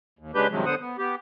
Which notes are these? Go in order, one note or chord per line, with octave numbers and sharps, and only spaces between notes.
D#2
C#3 G#3 D4 G4 B4 G6
G2 C3 D#3 F3 F#3 G#3
D3 B3 C5 F#5 D#6
B3
B3 G4